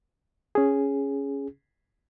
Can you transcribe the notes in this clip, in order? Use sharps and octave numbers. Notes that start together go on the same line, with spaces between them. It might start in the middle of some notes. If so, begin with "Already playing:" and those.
C#4 G#4